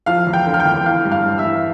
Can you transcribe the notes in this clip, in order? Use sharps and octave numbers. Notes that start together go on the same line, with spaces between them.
F3 F5 F6
E2
G5 G6
D3
F6
G5 G6
E2
E3 F5 F6
G2
F5 F6
G2
E5 E6
E3